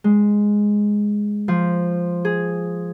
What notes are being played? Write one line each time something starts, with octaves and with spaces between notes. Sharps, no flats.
G#3
F3
G#4